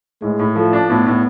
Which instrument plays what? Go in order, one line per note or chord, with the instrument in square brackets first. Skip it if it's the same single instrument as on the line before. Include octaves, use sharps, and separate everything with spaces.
[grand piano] A2 [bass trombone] G#3
[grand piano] A2
[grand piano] F3 [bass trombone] A3
[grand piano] D4
[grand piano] A2 [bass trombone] B3
[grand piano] A2